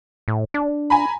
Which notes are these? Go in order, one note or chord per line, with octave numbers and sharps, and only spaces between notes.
A2
D4
G#5 A#5 B5